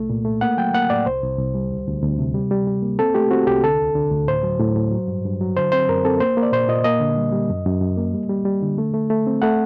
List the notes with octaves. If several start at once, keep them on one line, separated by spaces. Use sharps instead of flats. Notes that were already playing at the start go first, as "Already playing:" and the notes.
Already playing: C2 A3
A#2
A3
A#3 F#5
F#3 G5
A#3 F#5
A2 D5
C2 C5
C2
C2
G3
D2
D2
D2
C3
G3
G3
G3
A#3
C4 A4
A3 G4
C4 F#4
C2 G4
D3 A4
D2
D3
D2
A2 C5
F#3
A2
A2
F#3
G2
G2
F#3
D3 C5
C4 C5
F#2 A#4
C4 A4
A#3 C5
A#3
D5
A#2 C5
A#2 D#5
A#3 D#5
D3
G3
G3
F#2
F#2
F#2
A#3
G3
G3
G3
D3
A3
A3
A3
C4
A3 F#5